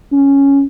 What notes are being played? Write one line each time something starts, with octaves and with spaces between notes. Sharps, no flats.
C#4